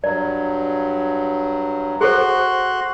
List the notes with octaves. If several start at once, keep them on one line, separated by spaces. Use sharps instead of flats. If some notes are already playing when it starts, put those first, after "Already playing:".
G2 F#3 D5
F#4 G#4 A4 C5 C6 F#6